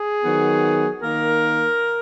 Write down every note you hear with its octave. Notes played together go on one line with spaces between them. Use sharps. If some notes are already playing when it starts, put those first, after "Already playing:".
Already playing: G#4
D#3 F#3 B3
D#3 A#3 A#4